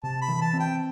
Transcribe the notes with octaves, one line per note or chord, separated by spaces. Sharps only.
C3 A5
B5
E3
A5
C4
G5